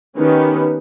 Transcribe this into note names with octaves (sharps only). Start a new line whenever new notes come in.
D#3 B3 C#4 D#4 G4 B4